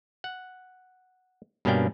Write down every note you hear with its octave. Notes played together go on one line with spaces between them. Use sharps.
F#5
G2 B2 A#3 C#4 D4 G5